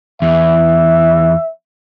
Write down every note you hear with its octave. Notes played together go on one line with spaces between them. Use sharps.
E2 E5